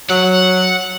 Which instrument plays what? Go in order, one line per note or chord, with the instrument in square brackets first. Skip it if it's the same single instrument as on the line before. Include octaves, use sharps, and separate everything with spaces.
[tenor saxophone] F#3 [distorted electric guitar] F#5